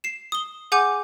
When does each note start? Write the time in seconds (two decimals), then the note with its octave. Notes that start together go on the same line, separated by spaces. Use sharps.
0.04 C7 E7
0.32 D#6 G7
0.72 G#4 F#5 G#5 D6 G6